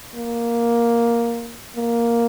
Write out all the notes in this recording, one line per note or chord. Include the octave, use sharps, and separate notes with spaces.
A#3
A#3